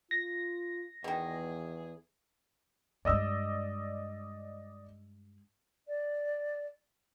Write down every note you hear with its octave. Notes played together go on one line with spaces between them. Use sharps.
F4 A#6
E2 B2 D#3 G#4
G2 G#3 D5 D#5 E6
D5